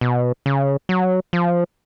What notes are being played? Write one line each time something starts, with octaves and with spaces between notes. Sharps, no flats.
B2
C#3
F#3
F3